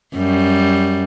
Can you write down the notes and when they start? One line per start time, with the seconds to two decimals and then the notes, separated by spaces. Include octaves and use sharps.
0.15 F#2 G3